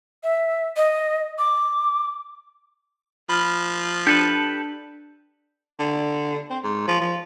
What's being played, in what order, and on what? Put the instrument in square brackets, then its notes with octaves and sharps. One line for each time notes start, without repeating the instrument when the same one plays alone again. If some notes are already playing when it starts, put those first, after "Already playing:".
[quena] E5
D#5
D6
[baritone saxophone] F3 [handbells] B5 F6
[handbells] D4 [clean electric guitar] G4 A4 B4
[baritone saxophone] D3
C4
G#2
F3
F3